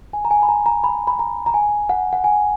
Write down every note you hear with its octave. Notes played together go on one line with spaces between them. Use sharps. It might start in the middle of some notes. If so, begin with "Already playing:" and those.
G#5
A#5
G#5
B5
A#5
A#5
B5
B5
A#5
A#5
G#5
F#5
F#5
G#5